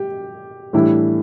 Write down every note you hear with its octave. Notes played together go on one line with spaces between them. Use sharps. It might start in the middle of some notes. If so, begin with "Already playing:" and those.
Already playing: G4
A2 E3 G3 D4 E4